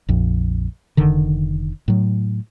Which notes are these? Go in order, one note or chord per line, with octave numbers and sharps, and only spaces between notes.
A#1 F2
F1 D3 D#3
A2 F#3